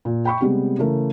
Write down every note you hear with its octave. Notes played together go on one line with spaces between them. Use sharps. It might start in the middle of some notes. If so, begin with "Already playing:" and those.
A#2
G5 B5 C#6
C3 G3 G#3 B3 G4
C#3 E3 A3 A#4